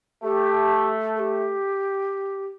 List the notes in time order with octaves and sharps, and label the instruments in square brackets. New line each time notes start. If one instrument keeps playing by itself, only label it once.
[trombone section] A3 [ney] G4
[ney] A4
G4